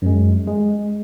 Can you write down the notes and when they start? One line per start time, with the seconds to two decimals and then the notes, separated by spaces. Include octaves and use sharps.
0.02 F#2 G#3
0.48 G#3